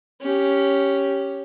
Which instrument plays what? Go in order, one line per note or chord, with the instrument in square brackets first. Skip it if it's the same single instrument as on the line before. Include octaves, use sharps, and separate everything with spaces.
[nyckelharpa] C#4 G4